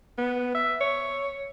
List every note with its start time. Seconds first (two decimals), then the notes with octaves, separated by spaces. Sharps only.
0.18 B3
0.55 E5
0.81 C#5